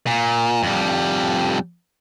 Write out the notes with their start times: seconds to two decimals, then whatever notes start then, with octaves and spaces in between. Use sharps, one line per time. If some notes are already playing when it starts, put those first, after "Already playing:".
0.07 A#2
0.63 F2 G3